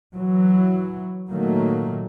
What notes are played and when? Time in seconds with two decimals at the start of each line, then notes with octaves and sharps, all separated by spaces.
0.15 E3 F#3
1.29 A#2 D#3 F#3 A3 A#3